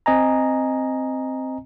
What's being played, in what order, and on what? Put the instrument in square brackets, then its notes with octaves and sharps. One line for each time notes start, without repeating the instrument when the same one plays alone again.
[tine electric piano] C4 D#5 G#5 A#5